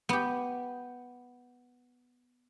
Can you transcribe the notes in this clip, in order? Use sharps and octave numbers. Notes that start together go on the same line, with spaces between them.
B3 G4